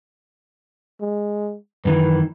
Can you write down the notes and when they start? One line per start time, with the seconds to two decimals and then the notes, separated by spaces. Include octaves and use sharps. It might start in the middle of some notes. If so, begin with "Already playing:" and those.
1.01 G#3
1.85 F#2 D#3 E3 B4